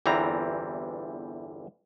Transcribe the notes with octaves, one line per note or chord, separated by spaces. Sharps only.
G1 E2 E3 G3 C4 A#5